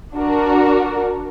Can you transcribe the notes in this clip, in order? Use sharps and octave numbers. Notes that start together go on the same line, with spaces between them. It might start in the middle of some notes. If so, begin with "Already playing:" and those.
D4 F#4 A#4